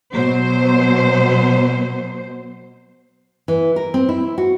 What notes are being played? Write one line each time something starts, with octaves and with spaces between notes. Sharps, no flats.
B2 F#3 C5
E3
A#4
C4
E4
F#4